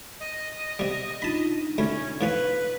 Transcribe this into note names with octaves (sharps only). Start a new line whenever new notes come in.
D#5
C3 G3
D4 D#4 F4 A5 B5
D2 A3 C#4 B5
A2 F3 C#4 B4